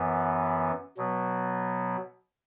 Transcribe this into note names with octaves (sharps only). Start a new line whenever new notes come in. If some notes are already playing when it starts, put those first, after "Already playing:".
Already playing: F#2 E3 B3
B2 F#3 B3